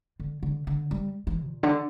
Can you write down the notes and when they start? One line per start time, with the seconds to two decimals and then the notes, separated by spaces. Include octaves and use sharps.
0.20 D3
0.43 D3
0.67 D3
0.91 G3
1.27 E3
1.45 A#2
1.63 D3